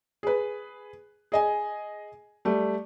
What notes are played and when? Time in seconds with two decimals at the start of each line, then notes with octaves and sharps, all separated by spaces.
0.23 G#4 B4
1.32 G#4 D#5 G#5
2.45 G3 A3